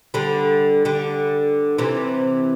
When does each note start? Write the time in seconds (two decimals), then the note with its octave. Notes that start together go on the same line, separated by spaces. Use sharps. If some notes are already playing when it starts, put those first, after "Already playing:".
0.14 D3 G3
0.85 D3 G3
1.78 C3 E3